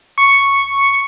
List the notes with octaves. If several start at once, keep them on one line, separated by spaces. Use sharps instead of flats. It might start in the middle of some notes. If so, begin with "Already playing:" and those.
C#6